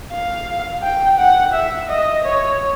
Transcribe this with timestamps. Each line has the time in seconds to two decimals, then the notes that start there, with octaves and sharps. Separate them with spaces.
0.12 F5
0.83 G5
1.18 F#5
1.54 E5
1.89 D#5
2.24 C#5